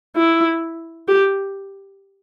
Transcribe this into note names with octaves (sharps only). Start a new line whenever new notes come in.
E4
G4